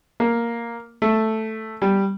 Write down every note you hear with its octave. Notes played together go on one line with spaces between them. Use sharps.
A#3
A3
G3